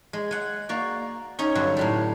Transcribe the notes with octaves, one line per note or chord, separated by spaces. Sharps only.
G#3
G#3 F#5
A#3 F#4 D5
C#4 D#4 C#5
G2 D3 F#3
A2 F#3 G3